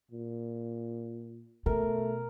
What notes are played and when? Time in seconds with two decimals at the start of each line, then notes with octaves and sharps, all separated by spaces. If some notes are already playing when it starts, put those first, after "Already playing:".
0.11 A#2
1.66 B2 A3 A#4